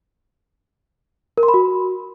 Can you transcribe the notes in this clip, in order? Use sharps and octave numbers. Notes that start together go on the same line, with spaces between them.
A#4
C6
B5
F#4